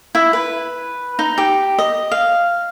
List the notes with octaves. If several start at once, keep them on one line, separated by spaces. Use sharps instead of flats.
E4
B4
D#4
G4
D#5
F5